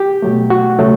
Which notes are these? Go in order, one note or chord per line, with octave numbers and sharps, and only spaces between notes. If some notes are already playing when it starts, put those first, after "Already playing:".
Already playing: G4
B2 F#3 A3
F#4
C#3 F#3 A3